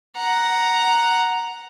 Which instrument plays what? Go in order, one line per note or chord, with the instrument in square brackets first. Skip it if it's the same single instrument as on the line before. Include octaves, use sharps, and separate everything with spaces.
[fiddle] F#5 A#5